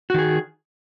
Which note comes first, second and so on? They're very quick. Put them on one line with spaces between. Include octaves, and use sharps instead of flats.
F#4 D#3 G#4